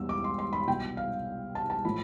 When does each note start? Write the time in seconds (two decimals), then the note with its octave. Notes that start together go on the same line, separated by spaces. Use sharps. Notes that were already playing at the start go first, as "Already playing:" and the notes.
Already playing: E2 B2 G3 E6
0.09 D6
0.24 C6
0.39 C6
0.53 B5
0.67 C2 B2 G3 G5
0.97 F5
1.55 A5
1.70 A5
1.85 A2 F3 B5